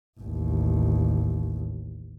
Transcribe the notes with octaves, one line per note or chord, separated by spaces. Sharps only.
A1 D#2